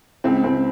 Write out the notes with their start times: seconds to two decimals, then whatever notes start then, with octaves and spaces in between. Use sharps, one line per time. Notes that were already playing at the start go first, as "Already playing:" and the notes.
0.24 C#2 C4
0.44 C#2 C4